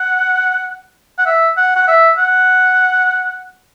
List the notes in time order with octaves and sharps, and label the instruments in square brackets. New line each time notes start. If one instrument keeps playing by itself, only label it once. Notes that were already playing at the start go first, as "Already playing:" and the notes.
Already playing: [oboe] F#5
F#5
E5
F#5
F#5
E5
F#5